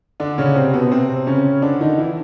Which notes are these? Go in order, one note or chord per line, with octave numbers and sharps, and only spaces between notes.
D3 D4
C#3 C#4
C3 C4
B2 B3
C3 C4
C#3 C#4
D3 D4
D#3 D#4
E3 E4